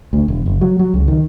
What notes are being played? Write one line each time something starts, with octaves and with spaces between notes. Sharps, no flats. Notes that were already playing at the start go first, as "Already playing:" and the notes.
D2
E1
F#1
F#3
F#3
C#2
D#3